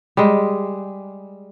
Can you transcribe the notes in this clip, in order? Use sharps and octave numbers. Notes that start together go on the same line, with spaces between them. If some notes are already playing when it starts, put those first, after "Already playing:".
G3 G#3